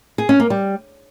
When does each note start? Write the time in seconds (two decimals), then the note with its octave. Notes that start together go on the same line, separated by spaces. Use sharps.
0.18 G#4
0.29 C#4
0.40 A#3
0.50 G3